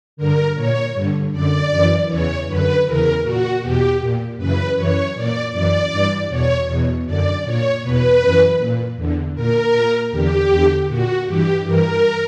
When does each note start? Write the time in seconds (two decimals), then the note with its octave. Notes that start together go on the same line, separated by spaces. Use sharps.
0.17 G2 D3 A#4
0.55 A#2 C#5
0.94 G2 D3
1.32 F#2 D3 D5
1.70 F#2 E3
2.08 E2 C#3 E3 C#5
2.46 F#2 D3 B4
2.85 E2 C#3 E3 A#4
3.23 A#2 F#4
3.61 E2 B2 G4
4.00 A#2
4.37 F#2 C#3 E3 B4
4.76 F#2 E3 C#5
5.14 A#2 D5
5.52 F#2 E3 D5
5.91 G2 E3
6.29 E2 B2 C#5
6.67 E2 B2
7.06 F#2 D3 D5
7.43 A#2 C#5
7.82 E2 B2 B4
8.20 F#2 E3
8.58 A#2
8.96 E2 D3
9.35 A#2 A#4
9.73 A#2
10.11 E2 D3 G4
10.50 E2 D3
10.88 A#2 F#4
11.26 G2 E3 G4
11.64 G2 E3 A#4